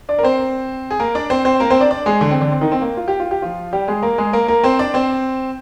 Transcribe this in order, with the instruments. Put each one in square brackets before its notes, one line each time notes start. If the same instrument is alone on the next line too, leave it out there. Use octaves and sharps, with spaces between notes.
[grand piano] D4 D5
A#4
C4 C5
G#4
A#3 A#4
D4 D5
C4 C5
C4 C5
A#3 A#4
C4 C5
D4 D5
D4 D5
G#3 G#4
D3 D4
C4
D3 D4
C4
D#3 D#4
C4
A#3
F4
G4
F4
G4
F3 F4
G3 G4
G#3 G#4
A#3 A#4
G#3 G#4
A#3 A#4
A#3 A#4
C4 C5
D4 D5
C4 C5